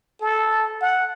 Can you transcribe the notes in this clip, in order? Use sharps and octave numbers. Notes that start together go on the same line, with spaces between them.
A4
F#5